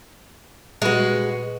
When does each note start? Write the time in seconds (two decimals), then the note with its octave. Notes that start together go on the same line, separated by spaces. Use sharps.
0.82 A#2 G3 G#3 F#4 B4